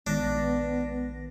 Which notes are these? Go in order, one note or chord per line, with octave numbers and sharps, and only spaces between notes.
A#1 D#3 G#3 B3 D4 A#6